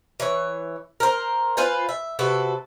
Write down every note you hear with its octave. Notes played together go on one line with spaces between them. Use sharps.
E3 C#5
A#4 C5
F4 B4 C5 G#5
E5
C3 F#4 A4 B4